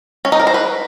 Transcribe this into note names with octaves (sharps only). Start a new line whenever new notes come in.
C#4
D#4
A#4
C5
B4